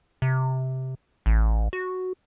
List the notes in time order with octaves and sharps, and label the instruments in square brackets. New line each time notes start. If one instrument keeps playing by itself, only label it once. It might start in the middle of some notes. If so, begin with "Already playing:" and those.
[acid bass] C3
A1
F#4